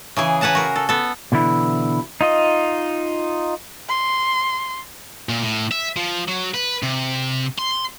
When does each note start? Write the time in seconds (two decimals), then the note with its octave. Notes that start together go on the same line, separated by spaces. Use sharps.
0.16 C#3 E3 G#4
0.41 G#4 B4 F#5 A5 A#5
0.55 F#4 A#4
0.76 A4
0.89 B3 A4
1.32 B2 D3 E3 E4
2.21 D#4 F4 D#5
3.89 C6
5.29 A#2
5.42 A2
5.71 E5
5.97 F3
6.28 F#3
6.54 B4
6.83 C3
7.59 C6